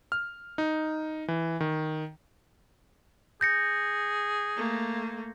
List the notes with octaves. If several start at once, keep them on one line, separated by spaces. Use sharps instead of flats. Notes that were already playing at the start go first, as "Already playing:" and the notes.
F6
D#4
E3
D#3
G#4 G6 A#6 C#7
A3 A#3